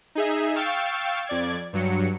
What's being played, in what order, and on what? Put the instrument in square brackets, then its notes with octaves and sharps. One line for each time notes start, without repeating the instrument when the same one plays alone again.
[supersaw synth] D#4 G#4 E5
F5 G5 C#6 E6 A6
F2 D5 G#6
G2 F#3 C#7